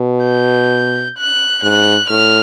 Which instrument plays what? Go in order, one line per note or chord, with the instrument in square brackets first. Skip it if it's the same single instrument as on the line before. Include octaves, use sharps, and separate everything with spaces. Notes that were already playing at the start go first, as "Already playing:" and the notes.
Already playing: [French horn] B2
[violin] G6
F#6
[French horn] G#2 [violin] F#6
[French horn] A2 [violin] F6